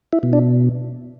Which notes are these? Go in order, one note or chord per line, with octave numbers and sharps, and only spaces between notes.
E4
B2
D4